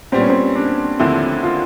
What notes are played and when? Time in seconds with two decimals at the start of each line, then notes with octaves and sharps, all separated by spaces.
0.12 A#2 G3 B3 C4
0.20 C#4
0.30 C4
0.55 D4
0.99 D#2 D3 F3 A3 C4 E4
1.43 F4